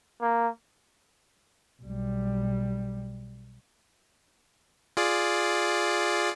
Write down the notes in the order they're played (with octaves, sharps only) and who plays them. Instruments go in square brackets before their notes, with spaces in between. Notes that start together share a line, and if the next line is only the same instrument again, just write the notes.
[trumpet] A#3
[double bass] B1 G3
[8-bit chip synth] F4 G#4 D5